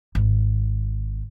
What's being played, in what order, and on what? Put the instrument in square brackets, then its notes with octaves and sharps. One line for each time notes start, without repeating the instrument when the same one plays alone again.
[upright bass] G#1